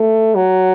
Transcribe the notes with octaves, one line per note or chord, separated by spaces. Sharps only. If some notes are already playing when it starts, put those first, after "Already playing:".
Already playing: A3
F#3